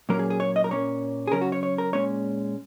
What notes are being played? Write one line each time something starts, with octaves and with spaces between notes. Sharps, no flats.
A#2 F#3 A#3 C#4 A#4
G#4
G#4
C#5
D#5
A#4
A#2 A#3 C#4 C#5
G#4
C#3 F#3 C#4 A#4
F#4
C#5
C#5
A#4
A#2 G#3 C#4 C#5